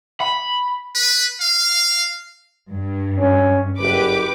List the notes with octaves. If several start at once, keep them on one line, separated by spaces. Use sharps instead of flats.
B5
B4
F5
G2
C#4
F#1 G4 B4 D6